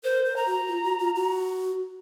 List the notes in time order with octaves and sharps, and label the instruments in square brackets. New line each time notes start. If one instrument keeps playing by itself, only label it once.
[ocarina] A#4 [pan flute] C5
[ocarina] A#4
[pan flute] A#5
[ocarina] F#4
F4
F#4
F4
F#4